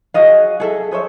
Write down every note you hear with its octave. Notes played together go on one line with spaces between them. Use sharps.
F#4 G#4 D#5 F5
G#4 A4 E5
G#4 C5 C#5 E5